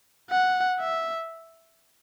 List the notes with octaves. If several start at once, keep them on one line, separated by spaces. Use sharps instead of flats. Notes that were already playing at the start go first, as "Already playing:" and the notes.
F#5
E5